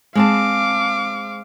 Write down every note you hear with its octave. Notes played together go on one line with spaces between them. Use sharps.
G#3 C4 F5 A5 D6